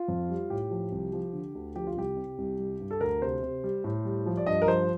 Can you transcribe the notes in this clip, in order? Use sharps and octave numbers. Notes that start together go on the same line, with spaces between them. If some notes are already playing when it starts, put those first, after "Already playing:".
Already playing: F4
F2
G3
A2 G4
F3
C2
F3
D3
D2
F3 G4
F4
C2 G4
C3
C2
G3
G2
A4
D2 A#4
C3 C5
C3
G3
A2
G3
F3
D5
G2 D#5
A#4
F3 C5